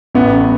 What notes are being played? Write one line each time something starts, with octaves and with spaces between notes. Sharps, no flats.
A1 B3